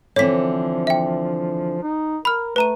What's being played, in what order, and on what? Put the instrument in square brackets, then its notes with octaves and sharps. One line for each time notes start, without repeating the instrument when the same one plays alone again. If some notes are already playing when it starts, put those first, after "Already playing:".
[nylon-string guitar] D3 E3 C4 [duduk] F3 [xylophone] C#5 B6
[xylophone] E5 G5
[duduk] D#4
[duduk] A#4 [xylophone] B5 F6
[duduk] A3 [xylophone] B4 A#5 D#7